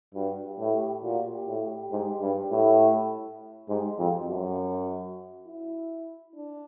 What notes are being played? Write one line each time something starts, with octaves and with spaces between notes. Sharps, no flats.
G2 F#4
G4
A2
G4
A#2 F#4
G4
A2
G4
G#2
G2
A2
G#2 G4
F2 F#4
F#2 F#4
E4
D4